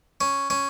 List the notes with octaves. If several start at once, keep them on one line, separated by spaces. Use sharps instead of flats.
C#4
C#4